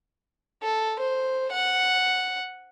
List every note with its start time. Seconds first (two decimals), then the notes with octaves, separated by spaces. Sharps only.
0.62 A4
0.99 C5
1.51 F#5